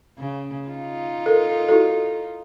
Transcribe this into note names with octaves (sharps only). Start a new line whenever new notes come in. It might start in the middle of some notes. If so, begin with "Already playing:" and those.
C#3
D#4 F4
A4 A#4
E4 F#4 A4